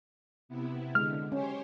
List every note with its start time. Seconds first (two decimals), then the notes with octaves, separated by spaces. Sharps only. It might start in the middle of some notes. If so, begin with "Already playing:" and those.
0.49 C3 B3 E4
0.95 D3 G#3 F6
1.32 C#4 G4 C5 C#5